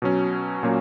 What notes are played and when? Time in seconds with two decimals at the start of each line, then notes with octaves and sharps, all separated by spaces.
0.02 B2 F#3 C#4
0.63 A#2 F#3 A#3 C#4